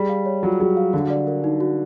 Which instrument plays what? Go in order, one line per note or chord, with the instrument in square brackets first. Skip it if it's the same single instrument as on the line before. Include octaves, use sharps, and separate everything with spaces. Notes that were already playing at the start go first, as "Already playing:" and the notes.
Already playing: [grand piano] G3 [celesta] G#4
[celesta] F5
C#5
[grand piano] F#3 [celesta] F4
[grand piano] F#3 [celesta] G#4
[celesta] F5
[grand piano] D3 [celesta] F#4
[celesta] D5
A#4
D#4
F#4